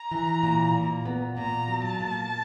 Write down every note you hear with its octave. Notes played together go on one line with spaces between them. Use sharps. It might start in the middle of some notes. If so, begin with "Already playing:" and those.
Already playing: A#5
E3
A#2
A#2
B3
A#2 A#5
F#3
A5
A#2